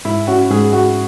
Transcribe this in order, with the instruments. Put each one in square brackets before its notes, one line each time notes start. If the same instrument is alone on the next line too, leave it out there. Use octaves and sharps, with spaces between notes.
[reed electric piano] G#2 [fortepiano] E4
[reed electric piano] C#4 [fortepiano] F#4
[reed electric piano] G#2 [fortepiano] G#4
[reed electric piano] G#3 [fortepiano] F#4